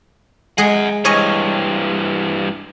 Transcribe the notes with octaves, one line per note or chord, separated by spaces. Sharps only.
G#3 G#4 F#5 G#5
G2 E3 C#5 D#5 G#5